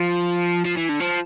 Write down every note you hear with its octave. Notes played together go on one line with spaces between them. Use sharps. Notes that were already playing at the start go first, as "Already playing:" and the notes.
Already playing: F3
F3
E3
D3
F3